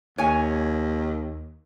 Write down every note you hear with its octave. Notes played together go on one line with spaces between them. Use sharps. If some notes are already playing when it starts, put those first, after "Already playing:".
D#2 C#5 G#5